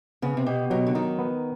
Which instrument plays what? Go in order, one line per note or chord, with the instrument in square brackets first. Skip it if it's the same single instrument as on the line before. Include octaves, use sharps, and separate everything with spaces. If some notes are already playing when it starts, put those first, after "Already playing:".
[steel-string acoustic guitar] C#3 [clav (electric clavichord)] B3
[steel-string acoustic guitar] C3
[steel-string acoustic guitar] B2 [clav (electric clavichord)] G4
[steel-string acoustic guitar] B2 [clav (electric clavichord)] F#3
[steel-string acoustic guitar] D3
[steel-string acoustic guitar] D#3 [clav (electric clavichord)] D#4
[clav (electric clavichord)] B3